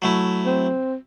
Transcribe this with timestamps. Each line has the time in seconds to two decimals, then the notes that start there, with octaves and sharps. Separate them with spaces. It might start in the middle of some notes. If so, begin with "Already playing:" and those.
0.02 F#3 A3 E4
0.46 C4